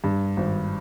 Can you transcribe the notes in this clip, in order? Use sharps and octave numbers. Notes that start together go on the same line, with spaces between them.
G2
G#1